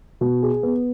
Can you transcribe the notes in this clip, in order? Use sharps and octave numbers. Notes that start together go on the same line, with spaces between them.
B2
G#4
B3